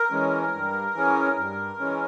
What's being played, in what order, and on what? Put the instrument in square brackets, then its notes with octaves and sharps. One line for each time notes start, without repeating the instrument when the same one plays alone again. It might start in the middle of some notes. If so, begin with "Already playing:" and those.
Already playing: [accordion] A#4
E3 G#3 C#4
G2
E3 G#3 C#4
G2
E3 G#3 C#4